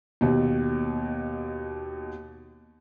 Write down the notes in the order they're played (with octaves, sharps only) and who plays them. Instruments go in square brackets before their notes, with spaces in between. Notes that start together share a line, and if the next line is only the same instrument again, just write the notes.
[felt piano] D#2 B2